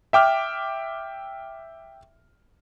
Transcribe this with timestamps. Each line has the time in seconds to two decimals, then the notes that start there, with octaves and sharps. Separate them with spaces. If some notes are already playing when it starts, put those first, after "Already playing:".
0.13 E5 G5 D6 F6